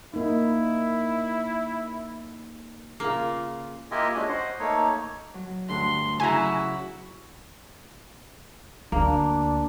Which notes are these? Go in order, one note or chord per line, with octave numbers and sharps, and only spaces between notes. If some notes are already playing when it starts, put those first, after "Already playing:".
A#3 D#4 E4
C#3 A#3 F4
A#3 E4 F4 G4 D#5 G#5
G#3 C#4 D4 E4 F#4
C5 D#5 F#5
A3 A#3 D#4 C#5
F#3
D2 G2 D3 C6
C#3 F#3 E4 F#4 G#5 A#5
D2 A#3 D4